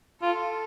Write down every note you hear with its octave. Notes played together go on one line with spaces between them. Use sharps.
F4 A4